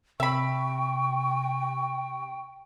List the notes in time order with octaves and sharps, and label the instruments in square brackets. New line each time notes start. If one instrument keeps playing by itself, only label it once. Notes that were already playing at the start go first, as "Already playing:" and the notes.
[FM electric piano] C3 [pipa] E5 B5 [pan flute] G5 [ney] C#6